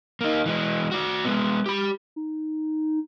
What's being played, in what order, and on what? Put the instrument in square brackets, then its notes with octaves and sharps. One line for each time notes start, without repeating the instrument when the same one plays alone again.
[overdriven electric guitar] A#3 D#4
E3 G#3
F#4 D5
G#3 B3
G4 B5
[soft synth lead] D#4